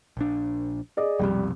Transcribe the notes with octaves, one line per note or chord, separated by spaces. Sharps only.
A#1 D4
G#4 D5 D#5
F1 B1 F2 G3